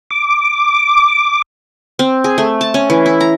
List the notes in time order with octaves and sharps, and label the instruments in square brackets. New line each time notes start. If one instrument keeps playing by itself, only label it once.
[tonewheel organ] D6
[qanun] C4
G#4
A3
A5
C#4
E3
E4
A#5